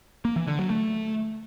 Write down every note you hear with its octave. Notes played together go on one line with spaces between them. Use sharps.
A#3
E3
D3
F#3
A3